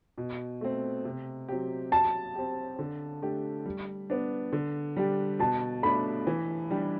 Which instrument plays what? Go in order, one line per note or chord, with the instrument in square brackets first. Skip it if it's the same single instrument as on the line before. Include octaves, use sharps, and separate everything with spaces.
[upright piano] B2
A3 C4
C3
F#3 C4 G4
[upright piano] F#3 [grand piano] A5
[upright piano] C4 G4
D3
A3 D4 G4
G3
B3 D4
D3
G3 D4 G4
[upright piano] B2 [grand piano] A5
[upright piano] A3 D4 [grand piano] B5
[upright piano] E3
G3 D4 G4